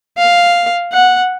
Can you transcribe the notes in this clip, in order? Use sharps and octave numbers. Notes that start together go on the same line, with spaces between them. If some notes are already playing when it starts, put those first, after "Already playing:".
F5
F#5